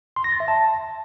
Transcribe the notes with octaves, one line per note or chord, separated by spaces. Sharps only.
C6
A#6
A6
E5
A5